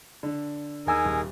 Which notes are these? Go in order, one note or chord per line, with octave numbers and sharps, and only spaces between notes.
D3
D#2 D#4 G#4 A#4 G#5 E6
D#1